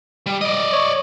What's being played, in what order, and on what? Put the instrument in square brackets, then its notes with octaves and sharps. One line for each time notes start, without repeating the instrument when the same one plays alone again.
[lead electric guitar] G3
D5 D#5
[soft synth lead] C#5